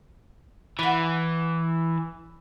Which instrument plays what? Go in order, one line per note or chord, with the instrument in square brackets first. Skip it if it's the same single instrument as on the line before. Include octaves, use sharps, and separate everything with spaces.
[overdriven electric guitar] E3 [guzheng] D5 F#5